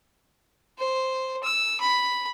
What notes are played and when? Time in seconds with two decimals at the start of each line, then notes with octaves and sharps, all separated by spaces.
0.78 C5
1.43 E6
1.80 B5